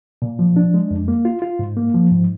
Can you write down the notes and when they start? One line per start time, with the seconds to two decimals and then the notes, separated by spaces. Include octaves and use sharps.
0.22 A#2
0.39 F3
0.56 D4
0.74 G#3
0.91 F2
1.08 A#3
1.25 F4
1.42 F4
1.59 G#2
1.77 A#3
1.94 F3
2.11 G#2